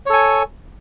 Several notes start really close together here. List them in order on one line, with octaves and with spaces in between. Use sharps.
C#5 A4 G#5